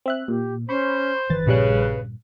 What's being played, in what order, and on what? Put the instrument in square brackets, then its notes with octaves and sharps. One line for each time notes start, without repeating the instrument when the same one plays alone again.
[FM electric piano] C4 E5 F#6
[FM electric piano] A#2 [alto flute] G4
[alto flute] C#4 [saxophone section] C5 [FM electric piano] B5 C#6
[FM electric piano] G1 A6 [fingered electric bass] G2 D#3 E3 [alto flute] B4
[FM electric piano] A#1 G3 F#6 [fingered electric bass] G2 A#2 [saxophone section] C#3